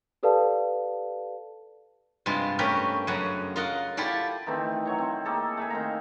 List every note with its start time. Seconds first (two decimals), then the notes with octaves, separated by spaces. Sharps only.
0.23 G4 A4 B4 D5 F5 A5
2.26 G2 C3 G#3 F4
2.59 A3 C4 C#4 G4 A#4 B4
3.07 F#2 C#3 F#5
3.56 F4 A#4 D#5 F#5
3.97 E4 F4 G4 A4 D5
4.46 D#3 E3 A3 C4
4.85 F#3 C#5 C#6
4.98 C4
5.25 A#3 G#4 A4 C#6
5.57 A3 E5 G#5
5.70 D#3 C4 F5 A#5